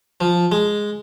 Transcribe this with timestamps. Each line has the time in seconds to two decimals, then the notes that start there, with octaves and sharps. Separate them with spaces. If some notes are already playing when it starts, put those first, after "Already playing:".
0.21 F3
0.52 G#3